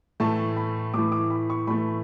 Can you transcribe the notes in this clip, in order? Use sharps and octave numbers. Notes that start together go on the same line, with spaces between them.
A2 E3 A3 A5
B5
A2 E3 A3 D6
D6
B5
C#6
A2 E3 A3 B5